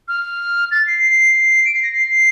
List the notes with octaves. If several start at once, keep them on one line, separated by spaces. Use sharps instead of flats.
F6
A6
C7
C7
D7
C7
A#6
C7